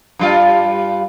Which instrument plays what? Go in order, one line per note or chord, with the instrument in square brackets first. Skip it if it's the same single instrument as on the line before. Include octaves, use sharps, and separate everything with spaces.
[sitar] G2 G3 F4